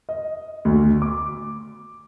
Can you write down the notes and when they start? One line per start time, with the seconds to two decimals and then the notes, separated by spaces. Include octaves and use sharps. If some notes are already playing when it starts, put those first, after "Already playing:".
0.09 D#5
0.65 D2
1.02 D6